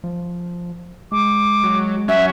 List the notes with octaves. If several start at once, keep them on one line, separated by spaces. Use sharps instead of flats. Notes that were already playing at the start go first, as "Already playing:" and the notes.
F3
G#3 D6
F#3
F#3 C#4 E5 F#5